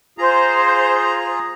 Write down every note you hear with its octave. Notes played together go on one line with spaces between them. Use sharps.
F4 G#4 C5 A#5